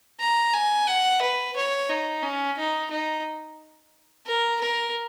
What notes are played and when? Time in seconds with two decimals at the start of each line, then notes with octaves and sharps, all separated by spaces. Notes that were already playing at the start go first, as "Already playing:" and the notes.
0.20 A#5
0.54 G#5
0.87 F#5
1.22 B4
1.56 C#5
1.89 D#4
2.23 C#4
2.58 D#4
2.90 D#4
4.26 A#4
4.61 A#4